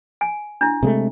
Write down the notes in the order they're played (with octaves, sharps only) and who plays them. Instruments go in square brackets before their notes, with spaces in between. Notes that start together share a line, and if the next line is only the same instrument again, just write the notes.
[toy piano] G#5
D4 E4
[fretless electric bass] C3 G#3 A3